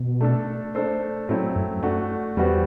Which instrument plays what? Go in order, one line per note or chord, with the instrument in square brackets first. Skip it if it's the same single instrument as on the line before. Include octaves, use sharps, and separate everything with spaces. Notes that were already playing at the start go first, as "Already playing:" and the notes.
Already playing: [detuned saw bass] B2
[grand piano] A3 D4 A4
A3 D4 A4 C5
[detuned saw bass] A2 [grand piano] F#3 A3 C4 E4
[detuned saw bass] F#2
[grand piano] A3 D4 F#4
[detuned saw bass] E2 [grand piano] G3 B3 F#4 C5